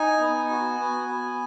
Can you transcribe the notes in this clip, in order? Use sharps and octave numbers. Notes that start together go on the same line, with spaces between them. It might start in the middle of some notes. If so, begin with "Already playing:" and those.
Already playing: D#4 G#5
B3
F#4
B3
B3